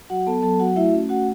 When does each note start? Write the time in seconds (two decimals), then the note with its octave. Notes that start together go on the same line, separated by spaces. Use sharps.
0.10 F#3 F#4 F#5
0.27 B3 A4 A5
0.43 F#3 A4 A5
0.59 F#4 F#5
0.76 A3 E4 E5
0.94 C#4
1.09 A3 F#4 F#5